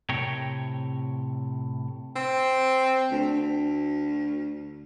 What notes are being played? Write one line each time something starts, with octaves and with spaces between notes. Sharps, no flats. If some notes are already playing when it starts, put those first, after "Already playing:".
A2 C3 A#4 C#5 G5
C4
D2